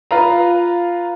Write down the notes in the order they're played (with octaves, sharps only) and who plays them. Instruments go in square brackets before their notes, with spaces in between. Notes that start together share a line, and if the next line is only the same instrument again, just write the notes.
[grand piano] F4 B4 F5 A#5